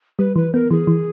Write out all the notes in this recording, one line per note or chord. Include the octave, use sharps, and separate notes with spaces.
G3 B4
E3 B4
B3 A#4
E3 G#4
E3